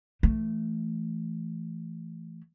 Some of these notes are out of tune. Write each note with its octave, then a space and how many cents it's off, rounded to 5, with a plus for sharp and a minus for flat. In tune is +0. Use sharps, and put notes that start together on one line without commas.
E3 +20 A3 +0